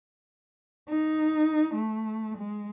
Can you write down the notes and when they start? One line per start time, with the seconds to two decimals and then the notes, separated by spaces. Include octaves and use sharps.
0.89 D#4
1.75 A3
2.38 G#3